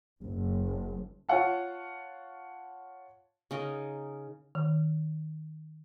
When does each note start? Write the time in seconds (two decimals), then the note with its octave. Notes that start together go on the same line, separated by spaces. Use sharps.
0.22 F#1
1.29 F4 C#5 F5 F#5 A5
3.51 C#3 D#4 A#4
4.55 D#3